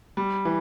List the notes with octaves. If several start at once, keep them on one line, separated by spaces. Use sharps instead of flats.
G3
E3